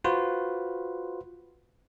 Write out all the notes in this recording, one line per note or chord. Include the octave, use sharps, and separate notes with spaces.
F4 F#4 B4 C5